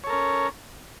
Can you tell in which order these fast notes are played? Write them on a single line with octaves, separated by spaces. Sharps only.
C#5 A4 A#4 C#4